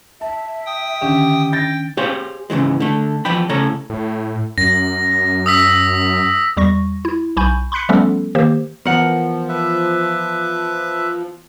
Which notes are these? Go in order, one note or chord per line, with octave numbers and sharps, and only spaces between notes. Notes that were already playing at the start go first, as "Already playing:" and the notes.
E5 A5
G5 D#6
D3 D#3 C#4 D4 G4
G5 G6 A6 A#6
G4 G#4 C5 C#5 F5
G#2 C#3 E3 G#3
D3 A3
E2 F3 B3 G5 B5
A2 C#3 A4 C#5 A#5
A2
F#2 A#6
D#6 E6 B6
E2 G3 C#6 A#6
E4
B1 G#5 B5 C#6 G6
B5 C6 F#6 B6 C#7
F3 G3 A3 B3 C#4 A4
D#3 A#3 G4 C5
E3 F3 B3 A#4 F#5
B4 E5